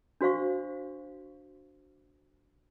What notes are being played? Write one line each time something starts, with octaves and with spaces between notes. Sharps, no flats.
D4 F#4 C5 F5 C#6